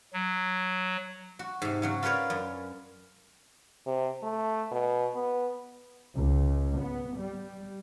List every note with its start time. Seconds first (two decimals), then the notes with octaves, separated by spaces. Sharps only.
0.13 F#3
1.39 F#4
1.62 G#2 C3
1.82 C#3 F#3 F#4
2.03 F4 A#4 B4 C#5 D5
2.30 F#2
3.87 C3
4.23 A3
4.72 B2
5.15 B3
6.15 C#2
6.80 B3
7.17 G3